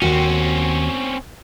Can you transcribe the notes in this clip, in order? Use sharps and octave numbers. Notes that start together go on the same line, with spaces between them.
D#2 C4 C#4 F#4